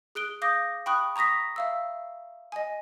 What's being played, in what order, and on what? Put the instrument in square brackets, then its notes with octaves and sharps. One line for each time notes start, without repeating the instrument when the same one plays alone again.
[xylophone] G#4 F#6 D7 G7
F5 D6 D#6 G6 A#6
G5 B5 C#6 D#6 F#6
A#5 C#6 D#6 A#6 B6
E5 F5 E6
D#5 G#5